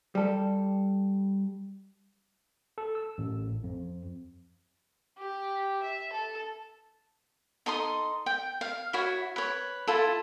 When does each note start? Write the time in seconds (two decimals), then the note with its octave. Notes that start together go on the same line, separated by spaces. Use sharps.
0.15 G3 A4
2.78 A4
2.95 E6
3.18 A1
3.64 F2
5.18 G4
5.82 E5
6.13 A4
7.66 D#4 A4 C6 D#6
8.26 G5
8.61 F5
8.93 E4 F#4 C#5
9.36 B4 C#5
9.87 E4 F4 A4